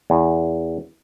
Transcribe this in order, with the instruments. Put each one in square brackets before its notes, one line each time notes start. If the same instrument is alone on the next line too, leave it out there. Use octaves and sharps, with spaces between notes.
[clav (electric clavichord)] E2